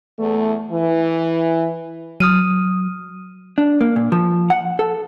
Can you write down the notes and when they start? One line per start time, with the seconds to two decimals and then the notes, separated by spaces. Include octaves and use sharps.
0.19 E2 A3
0.71 E3
2.20 F#3 D#6 F6 D#7
3.58 D4
3.81 A#3
3.96 A#2
4.12 F3
4.50 F#5
4.79 A4